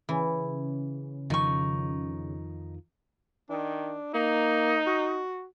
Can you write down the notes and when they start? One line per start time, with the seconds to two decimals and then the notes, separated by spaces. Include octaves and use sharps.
0.09 C#3 E3
1.30 F2 D#3 F3 D#4 C#6
3.50 D#3 D4
4.14 A#3 D#4
4.86 F#4